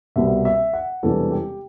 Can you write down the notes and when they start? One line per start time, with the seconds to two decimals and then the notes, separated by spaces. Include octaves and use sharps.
0.16 C2 B2 G3 E5
0.45 E5
0.73 F#5
1.03 E1 E2 C3 E3 G3 A4
1.31 G4